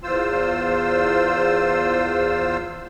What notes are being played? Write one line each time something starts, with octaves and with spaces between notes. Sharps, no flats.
E2 F4 C5 E6